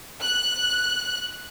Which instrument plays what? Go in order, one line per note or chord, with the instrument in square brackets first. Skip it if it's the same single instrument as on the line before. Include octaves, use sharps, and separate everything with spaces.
[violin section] F#6